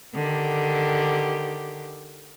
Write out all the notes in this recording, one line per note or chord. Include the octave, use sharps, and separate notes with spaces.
D3 D#3 G4